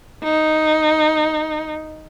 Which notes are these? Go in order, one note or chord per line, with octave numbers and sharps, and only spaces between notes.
D#4